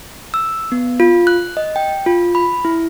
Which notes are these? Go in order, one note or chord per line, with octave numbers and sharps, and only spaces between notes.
E6
B3
F4
F#6
D#5
G5
F4
B5
E4